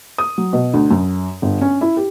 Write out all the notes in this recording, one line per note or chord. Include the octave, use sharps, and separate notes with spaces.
D#6
F#3
B2
D2
F#2
G1
C#4
E4
G4